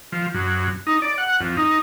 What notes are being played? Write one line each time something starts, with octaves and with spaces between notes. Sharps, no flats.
F3
F#2
D#4
D5
F#5
F2
D#4